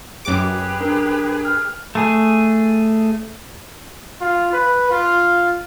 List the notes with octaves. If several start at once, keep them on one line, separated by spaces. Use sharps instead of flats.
F#2 G4 G#4 B4 D6
D4 A#4
F6
A3 G#4
F4
B4
F4